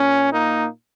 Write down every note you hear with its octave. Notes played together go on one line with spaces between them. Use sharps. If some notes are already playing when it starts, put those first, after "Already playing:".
Already playing: A#2 C#4
A#3 D#4